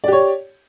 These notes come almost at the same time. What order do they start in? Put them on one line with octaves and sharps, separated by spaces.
D5 G4 C#5